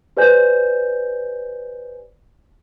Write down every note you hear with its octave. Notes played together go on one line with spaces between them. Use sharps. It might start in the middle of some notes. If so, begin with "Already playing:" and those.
G4 B4 C5 D5 G#5 G6